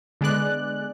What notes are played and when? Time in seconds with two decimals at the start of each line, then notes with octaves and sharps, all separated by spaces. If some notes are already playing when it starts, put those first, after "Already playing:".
0.21 D3 G#3 B3 D5 F#6